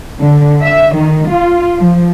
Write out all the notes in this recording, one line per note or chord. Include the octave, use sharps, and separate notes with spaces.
D3
E5
D#3
F4
F3